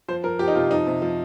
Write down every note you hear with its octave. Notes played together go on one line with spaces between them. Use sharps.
F3 C5
F3 A#4
F3 G4
D#4
C3 F4
F3 D#4
C3
F3